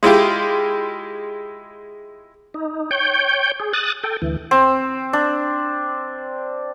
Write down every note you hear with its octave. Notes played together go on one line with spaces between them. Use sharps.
G#3 E4 F4 G4
D#4
C#5 G5 G6
G#4
D#6 F#6 A6
A4 G5
D2 E3
C4
D4